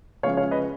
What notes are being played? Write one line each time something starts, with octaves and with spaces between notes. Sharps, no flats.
C#3 F3 G#3 C#4 C#5 F5
C#5 F5
B4 D#5